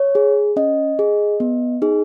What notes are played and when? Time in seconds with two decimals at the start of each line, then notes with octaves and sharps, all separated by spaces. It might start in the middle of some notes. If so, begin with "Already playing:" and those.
Already playing: C#5
0.15 G#4
0.56 C#4 D#5
0.99 G#4
1.40 B3
1.82 D#4 G#4